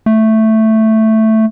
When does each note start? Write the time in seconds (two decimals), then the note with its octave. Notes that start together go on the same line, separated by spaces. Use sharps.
0.06 A3